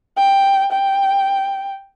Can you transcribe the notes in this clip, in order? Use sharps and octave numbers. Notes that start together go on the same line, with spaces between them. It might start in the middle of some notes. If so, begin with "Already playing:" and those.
G5
G5